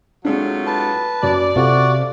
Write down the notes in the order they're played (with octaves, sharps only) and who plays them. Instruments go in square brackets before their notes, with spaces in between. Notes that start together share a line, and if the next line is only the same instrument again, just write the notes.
[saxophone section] A2 F#3 F4 [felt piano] G#3 C4 D4
[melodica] B4 A5
[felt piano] F#2 [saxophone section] D5
[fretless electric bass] C3 [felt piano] F4 A4 F5 [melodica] F#4